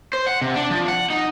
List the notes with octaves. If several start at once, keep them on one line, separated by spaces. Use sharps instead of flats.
C5
F#5
C3
D4
F3
F#5
D#4